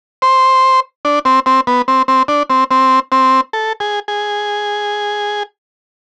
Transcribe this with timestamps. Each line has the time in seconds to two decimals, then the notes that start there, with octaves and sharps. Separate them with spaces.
0.22 C5
1.05 D4
1.25 C4
1.46 C4
1.67 B3
1.88 C4
2.08 C4
2.28 D4
2.50 C4
2.71 C4
3.12 C4
3.53 A4
3.80 G#4
4.08 G#4